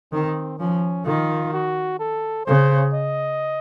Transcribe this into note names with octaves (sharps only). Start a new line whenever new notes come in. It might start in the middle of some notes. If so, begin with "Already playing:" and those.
D#3 C4
F3 C#4
D#3 F4
F#4
A4
C#3 C5
D#5